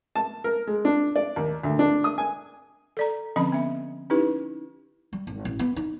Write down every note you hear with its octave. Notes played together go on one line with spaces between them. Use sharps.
A5
A#4
G#3
D4
D5
D#2
D2
D4
D#6
G#5
A4 D5 A#5
D3 F3 C4 C#4 D#5 B5
B3 E5
C#4 D#4 E4 G4 B4
G3
G#1
A1
B3
D#4